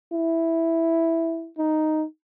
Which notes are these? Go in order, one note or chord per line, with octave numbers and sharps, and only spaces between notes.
E4
D#4